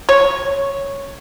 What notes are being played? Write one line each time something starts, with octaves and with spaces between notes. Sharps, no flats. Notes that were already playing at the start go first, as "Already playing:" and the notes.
C#5